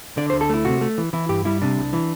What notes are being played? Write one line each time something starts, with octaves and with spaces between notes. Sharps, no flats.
D3 D5
D2 C5
A4
A3 E4
C3 F#4
A3
E3
E3 E4
G2 G4
G3 E4
C3 D4
C2
E3